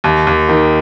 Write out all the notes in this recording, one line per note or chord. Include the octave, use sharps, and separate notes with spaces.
D#2
D#2
D#3